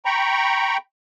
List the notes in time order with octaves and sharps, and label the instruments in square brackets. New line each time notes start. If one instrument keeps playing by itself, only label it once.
[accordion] G5 A#5 B5 C#6